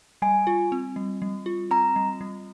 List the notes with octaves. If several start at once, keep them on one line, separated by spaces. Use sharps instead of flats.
G3 G#5
F4
C4
G3
G3
F4
C4 A#5
G3
G3